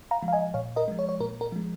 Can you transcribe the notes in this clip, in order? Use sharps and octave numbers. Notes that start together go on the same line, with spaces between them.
F5 A#5
F3 G#3
F5
D#5 G#5
A#2 C#5 F5
A#4 D#5
F3 G#3
C#5
C#5
A#2 A#4
A#4
F3 G#3